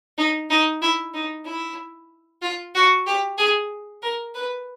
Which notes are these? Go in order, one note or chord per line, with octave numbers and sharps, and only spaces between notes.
D#4
D#4
E4
D#4
E4
F4
F#4
G4
G#4
A#4
B4